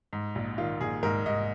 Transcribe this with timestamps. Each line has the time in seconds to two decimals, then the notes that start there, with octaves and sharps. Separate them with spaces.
0.13 G#2
0.35 A#1
0.58 D#3 F4
0.81 A#1 G#4
1.03 G#2 A#4
1.26 G#2 D#5